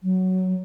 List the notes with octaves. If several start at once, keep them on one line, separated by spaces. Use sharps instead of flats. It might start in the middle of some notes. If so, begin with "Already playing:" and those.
F#3